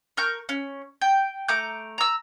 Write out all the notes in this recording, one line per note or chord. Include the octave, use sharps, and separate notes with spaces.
A#4 C#6 F6 G6
C#4
G5
A3 A#5 D6 G6
A#5 E6